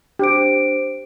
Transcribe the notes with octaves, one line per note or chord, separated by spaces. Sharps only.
D4 G4 C5 D7